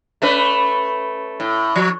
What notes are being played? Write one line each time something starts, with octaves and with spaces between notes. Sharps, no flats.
A3 C#4 B4
A2
F3